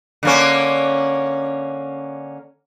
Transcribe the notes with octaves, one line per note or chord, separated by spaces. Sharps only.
D3 A#3 C#4